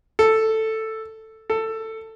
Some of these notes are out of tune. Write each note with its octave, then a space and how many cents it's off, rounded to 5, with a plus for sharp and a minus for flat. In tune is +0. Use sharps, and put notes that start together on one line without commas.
A4 +5
A4 +15